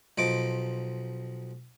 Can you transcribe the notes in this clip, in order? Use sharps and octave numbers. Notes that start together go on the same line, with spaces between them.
B1 F3 D#5 D6